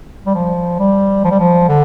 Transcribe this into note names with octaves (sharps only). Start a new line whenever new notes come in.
G3
F3
G3
F3
G3
F3
D3